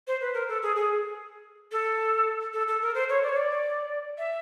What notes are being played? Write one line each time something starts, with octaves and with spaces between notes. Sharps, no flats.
C5
B4
A#4
A4
G#4
G#4
A4
A4
A4
A#4
C5
C#5
D5
C#5
D5
E5